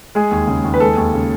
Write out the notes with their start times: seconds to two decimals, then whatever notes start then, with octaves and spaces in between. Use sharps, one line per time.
0.15 G#3 G#4
0.31 D#2
0.47 C#3
0.64 D#2
0.74 B4
0.80 G#3 A4
0.97 D#2
1.14 C#3